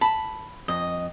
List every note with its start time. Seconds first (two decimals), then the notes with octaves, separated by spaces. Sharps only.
0.01 A5 B5
0.68 F2 D#5